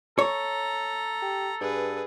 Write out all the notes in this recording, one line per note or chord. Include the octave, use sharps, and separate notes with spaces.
A4 C#5 A#5
G4
G2 G#4 B4